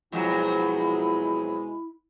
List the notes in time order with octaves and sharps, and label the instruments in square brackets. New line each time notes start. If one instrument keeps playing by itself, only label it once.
[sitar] F2 F#3 [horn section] B2 G#3 [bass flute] E4